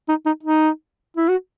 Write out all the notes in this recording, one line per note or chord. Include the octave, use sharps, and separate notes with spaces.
D#4
D#4
D#4
E4
F#4